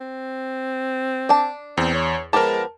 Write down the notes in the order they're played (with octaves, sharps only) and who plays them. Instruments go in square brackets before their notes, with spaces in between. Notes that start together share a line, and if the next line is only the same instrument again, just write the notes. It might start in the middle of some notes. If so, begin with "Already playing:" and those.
[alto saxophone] C4
[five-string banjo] D4 A5
[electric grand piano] E2 [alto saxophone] C4
[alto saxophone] C#5
[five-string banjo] F3 B3 G4 [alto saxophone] G#3 [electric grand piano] A#4 A5